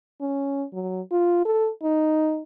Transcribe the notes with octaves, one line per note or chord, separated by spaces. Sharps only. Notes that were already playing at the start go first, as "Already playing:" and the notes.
C#4
F#3
F4
A4
D#4